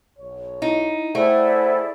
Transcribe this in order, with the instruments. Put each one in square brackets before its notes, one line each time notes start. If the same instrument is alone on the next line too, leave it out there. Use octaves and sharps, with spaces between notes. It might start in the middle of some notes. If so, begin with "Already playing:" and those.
[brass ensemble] B1 C#5
[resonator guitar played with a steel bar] D#4 [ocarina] E4
[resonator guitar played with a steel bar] A3 [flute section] E4 G#4 D5 [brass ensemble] A4 F#5 G5 [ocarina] C5